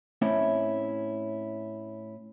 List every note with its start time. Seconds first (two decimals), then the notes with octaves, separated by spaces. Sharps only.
0.22 A2 C4 C#4 E4